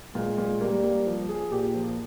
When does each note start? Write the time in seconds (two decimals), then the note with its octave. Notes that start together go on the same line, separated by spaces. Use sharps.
0.15 A#2 G#3
0.38 A#2
0.61 G3 A#3
0.83 A#3
1.06 F3
1.29 G#4
1.51 A#2 G4
1.74 F3